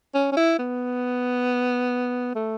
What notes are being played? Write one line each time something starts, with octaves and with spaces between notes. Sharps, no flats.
C#4
C#4
E4
B3
A3